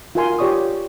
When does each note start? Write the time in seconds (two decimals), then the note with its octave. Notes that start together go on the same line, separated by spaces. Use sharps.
0.15 F4 F#4 A#4 F5 G#5 C6
0.38 F4 G4 C#5 D5 C#6 D#6